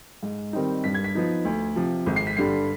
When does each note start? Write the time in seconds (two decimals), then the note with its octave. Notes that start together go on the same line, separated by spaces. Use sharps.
0.23 G#2
0.53 D#3 G3 C4 D#4
0.84 G2 B6
0.94 G#6
1.04 B6
1.15 F3 B3 D#4
1.45 D2
1.76 C3 F3
2.06 G#1
2.16 C7
2.27 B6
2.37 G2 D3 G3 C7